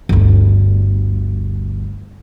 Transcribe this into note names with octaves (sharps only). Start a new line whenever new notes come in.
G1 D2